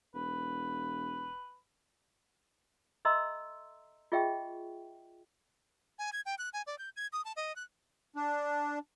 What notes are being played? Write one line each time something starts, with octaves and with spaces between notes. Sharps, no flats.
E1 B4
A4 D#5 E5 A#5 C6 E6
F4 G#4 D#5 E5 G5 C#6
G#5
G#6
G5
F#6
G#5
D5
G6
G#6
D#6
A5
D#5
F#6
D4